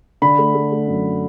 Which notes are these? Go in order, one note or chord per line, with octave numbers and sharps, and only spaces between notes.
D3 B5
A3
A3
A3
F#2